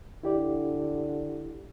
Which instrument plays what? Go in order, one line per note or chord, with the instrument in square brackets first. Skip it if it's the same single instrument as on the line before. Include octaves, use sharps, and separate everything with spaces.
[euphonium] D3 [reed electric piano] E4 G4 D5